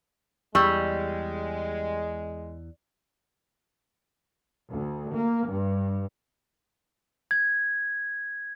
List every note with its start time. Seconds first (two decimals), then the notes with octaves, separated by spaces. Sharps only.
0.55 E2 G3 G#3 C#6 E6
4.68 D2
5.15 A#3
5.48 G2
7.31 G#6